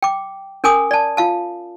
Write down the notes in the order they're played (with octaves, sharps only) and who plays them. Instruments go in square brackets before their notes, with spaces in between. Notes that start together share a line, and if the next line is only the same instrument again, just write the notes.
[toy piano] G5 D6
C#4 A#4 G#5 D6 D#6
D5 A5
F4 F5 A5